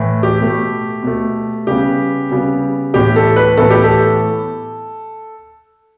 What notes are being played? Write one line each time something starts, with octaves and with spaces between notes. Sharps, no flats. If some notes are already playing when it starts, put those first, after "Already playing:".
Already playing: A2 E3 A3
G4
B2 A3
B2 A3
C#3 G3 B3 G4
C#3 G3 B3
A2 E3 B3 G4
A4
B4
A2 E3 B3 A4
G4
A4